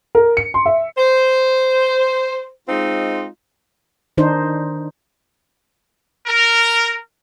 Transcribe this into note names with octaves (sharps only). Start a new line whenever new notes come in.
A#4
C#7
C6
E5
C5
G#3 C4 D#4 F4
D#3 D4 D#4 C5
A#4